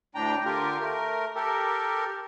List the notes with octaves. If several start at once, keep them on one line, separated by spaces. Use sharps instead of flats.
D2 A2 D4 G5 A#5
D3 F4 G4 A#4
A3 A#4
G4 A4 A#4